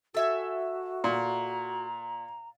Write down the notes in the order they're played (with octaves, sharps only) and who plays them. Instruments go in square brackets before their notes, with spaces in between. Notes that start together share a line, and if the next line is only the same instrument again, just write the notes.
[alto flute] F#4 [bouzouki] A4 E5 G#5
[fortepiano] A#2 [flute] A#5